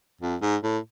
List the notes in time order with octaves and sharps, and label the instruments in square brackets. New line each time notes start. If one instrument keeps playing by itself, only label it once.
[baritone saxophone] F2
G#2
A2